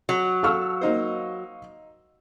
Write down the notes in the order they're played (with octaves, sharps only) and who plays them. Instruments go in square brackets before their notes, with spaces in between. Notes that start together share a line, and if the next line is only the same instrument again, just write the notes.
[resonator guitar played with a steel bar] F#3
[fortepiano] A4 F6 [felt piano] F5 C#6 E6
[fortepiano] A#3 D#4 C5